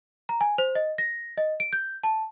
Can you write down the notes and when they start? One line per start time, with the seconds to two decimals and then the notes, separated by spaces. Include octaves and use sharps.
0.29 A#5
0.41 G#5
0.58 C5
0.75 D#5
0.98 A#6
1.37 D#5
1.60 D7
1.73 G6
2.04 A5